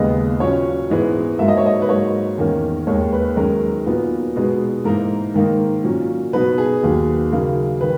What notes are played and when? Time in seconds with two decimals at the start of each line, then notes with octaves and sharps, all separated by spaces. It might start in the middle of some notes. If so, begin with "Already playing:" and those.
Already playing: D#2 C#3 G#3 B3 D#5
0.40 A#2 F#3 C#4 C#5
0.90 G#2 E3 G#3 B3
1.39 G#2 F#3 A#3 D#4 E5
1.48 D#5
1.57 C#5
1.66 D#5
1.82 B4
1.89 G#2 F#3 A#3 C#5
2.38 E2 D#3 A#3 C#4
2.87 D#2 D#3 G#3 D#4 C#5
3.13 B4
3.36 F#2 D#3 G#3 C#4 A#4
3.86 A#2 F#3 B3 D#4
4.36 B2 G#3 B3 D#4
4.84 G#2 E3 A#3 D#4 A#4
5.34 G#2 D#3 A#3 D#4
5.83 A#2 F#3 C#4
6.33 B2 F#3 B3 D#4 B4
6.58 G#4
6.83 D#2 D#3 F#3
7.32 F#2 C#3 F#3 A#3 D#4
7.81 D#3 B4